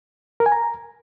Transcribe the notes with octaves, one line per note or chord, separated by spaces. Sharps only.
A#4
G#5
A#5